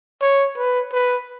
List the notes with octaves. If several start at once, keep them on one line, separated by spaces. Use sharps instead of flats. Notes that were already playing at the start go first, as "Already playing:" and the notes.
C#5
B4
B4